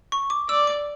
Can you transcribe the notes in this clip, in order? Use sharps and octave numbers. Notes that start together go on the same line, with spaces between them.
C#6
D6
D5 E6
D6